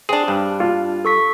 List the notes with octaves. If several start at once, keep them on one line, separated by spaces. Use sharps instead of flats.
C4 D4 G#4
G2
F4
A4 C#6 B6